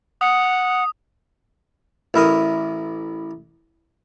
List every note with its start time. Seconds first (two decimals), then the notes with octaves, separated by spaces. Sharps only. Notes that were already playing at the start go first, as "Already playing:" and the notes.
0.21 F#5 D#6
2.14 A1 E4 A#4 D#6